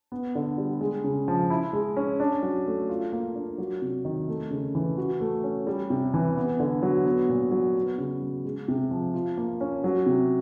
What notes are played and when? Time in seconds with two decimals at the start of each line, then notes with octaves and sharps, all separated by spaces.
0.12 B3
0.35 D3
0.58 G3
0.81 G#3
1.04 C#3
1.28 F3
1.50 E4
1.73 G#3
1.97 C#4
2.20 D4
2.43 F#3
2.67 A3
2.89 F4
3.12 A#3
3.35 D4
3.58 F#3
3.82 C3
4.05 D#3
4.28 A3
4.51 C#3
4.75 E3
4.98 F#4
5.20 A3
5.44 C#4
5.67 G3
5.90 C3
6.14 E3
6.37 B3
6.60 D3
6.83 F#3
7.06 B3
7.29 A#2
7.51 F#3
7.75 B3
7.98 C#3
8.21 F#3
8.45 G#3
8.68 C3
8.91 F3
9.14 F4
9.37 A#3
9.61 C#4
9.84 F#3
10.06 C3